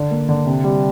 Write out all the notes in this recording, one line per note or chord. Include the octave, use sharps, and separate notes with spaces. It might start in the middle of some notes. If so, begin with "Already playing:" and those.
Already playing: D3
A#3
D3
C3
G3